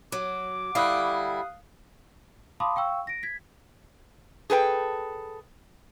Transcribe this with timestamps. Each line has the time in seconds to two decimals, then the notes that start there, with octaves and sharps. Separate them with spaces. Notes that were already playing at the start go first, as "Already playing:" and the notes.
0.12 F#3 D6
0.75 D3 G3 E4 F5 D#6 F#6
2.60 F5 A5 B5 C6 D6 D#6
2.76 F5 G5 C#6 E6
3.07 A#6 D7
3.23 G#6 B6
4.50 G#4 A4 B4 G5